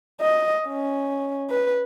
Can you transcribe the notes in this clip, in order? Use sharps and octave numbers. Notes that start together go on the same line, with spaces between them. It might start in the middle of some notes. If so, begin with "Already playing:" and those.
D#5
C#4
B4